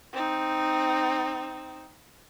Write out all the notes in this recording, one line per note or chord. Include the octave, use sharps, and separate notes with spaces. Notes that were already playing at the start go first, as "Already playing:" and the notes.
C4 D#4